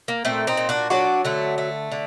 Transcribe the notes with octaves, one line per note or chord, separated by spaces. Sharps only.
A#3
A#2 A3 C4
C4 D#4
A#2
D4 F#4
F#3 D4 F#4
D3 A3
A3
D3